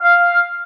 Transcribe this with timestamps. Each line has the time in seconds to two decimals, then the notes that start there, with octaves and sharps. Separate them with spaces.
0.02 F5